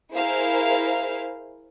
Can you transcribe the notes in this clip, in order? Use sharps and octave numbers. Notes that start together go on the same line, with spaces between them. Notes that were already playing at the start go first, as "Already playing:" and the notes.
E4 G#4 A#4 C5 F5